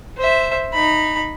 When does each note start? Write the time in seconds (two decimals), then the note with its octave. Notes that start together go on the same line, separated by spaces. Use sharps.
0.17 C5 E5
0.73 D#4 B5